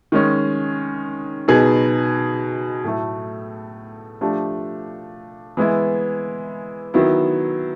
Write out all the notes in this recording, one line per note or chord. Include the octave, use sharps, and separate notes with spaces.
D#3 G#3 C#4
B2 F#3 B3 D#4 G#4
A2 F#3 A3
F3 A3 D4 G4
E3 G#3 B3 E4
D#3 F#3 B3 E4